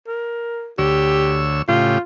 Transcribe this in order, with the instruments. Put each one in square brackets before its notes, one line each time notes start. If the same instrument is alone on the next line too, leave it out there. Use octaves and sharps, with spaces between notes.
[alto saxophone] A#4
[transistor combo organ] D2 C#5 E6 [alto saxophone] G4
[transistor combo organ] A2 C#3 G4 [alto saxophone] F4